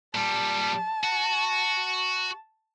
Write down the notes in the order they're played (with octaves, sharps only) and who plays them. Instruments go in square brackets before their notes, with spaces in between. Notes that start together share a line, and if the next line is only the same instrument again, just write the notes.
[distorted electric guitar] A#2 G3 [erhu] A5
[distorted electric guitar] F#4